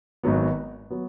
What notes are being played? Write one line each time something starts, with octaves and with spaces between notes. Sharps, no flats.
G#1 G#2 F#3 B3
F#3 B3